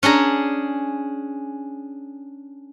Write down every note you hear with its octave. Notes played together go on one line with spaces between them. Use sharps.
C#4 D4 G#4 A#5